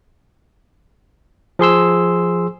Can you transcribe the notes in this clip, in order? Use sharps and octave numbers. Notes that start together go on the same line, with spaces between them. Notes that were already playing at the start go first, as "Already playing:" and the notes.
F3 G#4 C6 E6